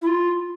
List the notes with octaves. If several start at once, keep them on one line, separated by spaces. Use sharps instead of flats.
E4
F4